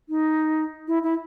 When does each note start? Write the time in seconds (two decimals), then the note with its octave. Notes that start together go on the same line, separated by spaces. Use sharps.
0.09 D#4
0.88 E4
1.03 E4